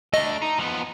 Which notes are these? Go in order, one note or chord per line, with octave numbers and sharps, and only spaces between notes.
A3 D4 D#5
D#4
F3 B3